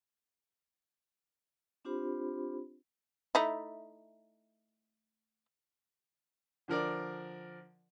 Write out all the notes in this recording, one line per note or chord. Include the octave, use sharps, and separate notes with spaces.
C4 D4 F4 G4 C5 B5
A3 D#4 E4
D3 F3 A#4 D5